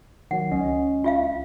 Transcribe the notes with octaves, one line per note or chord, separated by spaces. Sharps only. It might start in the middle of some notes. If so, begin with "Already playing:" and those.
D#3 F#3 F#5
C#2 C#4 D#5
F4 E5 F5